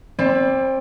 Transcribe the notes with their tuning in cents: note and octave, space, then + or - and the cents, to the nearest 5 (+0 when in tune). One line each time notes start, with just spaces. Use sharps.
C4 +25 D5 -5 B5 +0